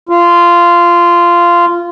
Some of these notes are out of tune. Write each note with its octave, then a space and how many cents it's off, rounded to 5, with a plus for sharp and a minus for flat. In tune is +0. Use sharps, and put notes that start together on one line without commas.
F4 -15